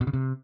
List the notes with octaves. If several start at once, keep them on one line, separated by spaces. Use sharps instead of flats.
B2
C#3
C3